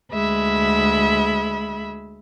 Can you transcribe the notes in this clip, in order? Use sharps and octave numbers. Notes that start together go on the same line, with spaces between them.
D2 G#3 E5 B5